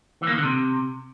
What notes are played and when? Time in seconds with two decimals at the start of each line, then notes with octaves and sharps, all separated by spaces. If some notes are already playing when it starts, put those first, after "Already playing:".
0.22 E3
0.27 A#3
0.32 D#3
0.38 D3
0.43 C3